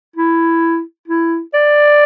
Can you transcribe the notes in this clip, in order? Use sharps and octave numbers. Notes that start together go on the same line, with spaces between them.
E4
E4
D5